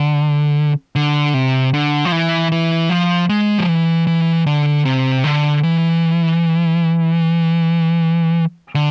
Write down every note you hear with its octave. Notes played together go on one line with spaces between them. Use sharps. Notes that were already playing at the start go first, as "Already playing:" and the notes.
Already playing: D3
D3
C3
D3
F3
E3
E3
F3
G#3
F3
E3
E3
D3
C3
D3
E3
D3